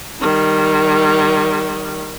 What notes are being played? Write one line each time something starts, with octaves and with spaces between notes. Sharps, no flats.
D#3 G3